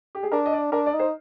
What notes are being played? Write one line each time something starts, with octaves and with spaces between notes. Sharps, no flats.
G4
G#4
D4 A#4
D#5
D5
D4 A#4
D5
D#4
C5